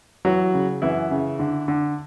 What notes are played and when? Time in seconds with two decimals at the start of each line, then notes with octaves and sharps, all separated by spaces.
0.25 E3 F#3 F#4
0.54 C#3
0.82 F#2 E3 E4
1.11 C#3
1.39 D3
1.68 D3